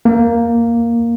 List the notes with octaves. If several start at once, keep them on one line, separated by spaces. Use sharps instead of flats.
A#3